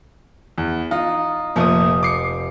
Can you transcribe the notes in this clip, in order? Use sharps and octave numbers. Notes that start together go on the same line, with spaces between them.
E2
D#4 F4
F1 A#2 F3 A3 D#6
D6 C7 C#7